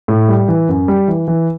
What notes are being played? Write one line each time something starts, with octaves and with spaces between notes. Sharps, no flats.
A2
G3
E3
F#2
G3
E3
E3